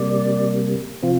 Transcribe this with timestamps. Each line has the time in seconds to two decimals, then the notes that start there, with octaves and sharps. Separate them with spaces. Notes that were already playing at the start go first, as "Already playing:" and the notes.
Already playing: C3 G3 A#3 D5
1.03 C3 F3 C4 F4